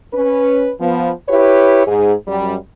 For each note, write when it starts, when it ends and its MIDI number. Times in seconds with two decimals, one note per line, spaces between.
0.13 0.70 61
0.13 0.70 71
0.80 1.11 53
0.80 1.11 59
1.29 1.83 64
1.29 1.83 67
1.29 1.83 71
1.29 1.83 73
1.86 2.14 44
1.86 2.14 68
2.28 2.56 42
2.28 2.56 55